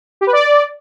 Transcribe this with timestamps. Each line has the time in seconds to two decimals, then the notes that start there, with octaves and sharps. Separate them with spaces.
0.21 G4
0.27 B4
0.33 D5